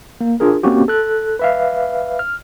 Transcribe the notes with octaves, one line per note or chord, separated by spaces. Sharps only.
A#3
D4 F4 G#4 A#4
A#3 C4 C#4 F#4 G4
A4 F#6
B4 E5 F5
F6